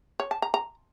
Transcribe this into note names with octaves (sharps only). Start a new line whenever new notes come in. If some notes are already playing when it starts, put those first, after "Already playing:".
C#5
A5
A#5
A#5